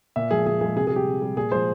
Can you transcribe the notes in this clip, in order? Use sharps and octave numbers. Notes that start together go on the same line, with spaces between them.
A#2 E5
F3 G#3 G#4
A#2 G#4
F3 G#3 G#4
C3 G#4
G#4
G3 G4
C3
G3
A#2 G#4
F3 G#3 C5